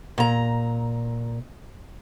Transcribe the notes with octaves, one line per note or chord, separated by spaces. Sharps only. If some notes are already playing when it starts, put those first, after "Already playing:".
A#2 A#5